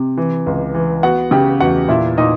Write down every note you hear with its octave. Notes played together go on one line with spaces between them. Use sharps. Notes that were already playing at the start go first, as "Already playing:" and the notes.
Already playing: C3
E3
C#2
E3
B3 F#4 F#5
C#3 G4 G5
E2 F#4 F#5
A#2 E4 E5
A#2 D#4 D#5